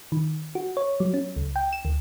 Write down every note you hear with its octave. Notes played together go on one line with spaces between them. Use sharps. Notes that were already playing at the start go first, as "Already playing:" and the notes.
D#3
F#4
C#5
F#3
C#4
C#2
G5
E7
D2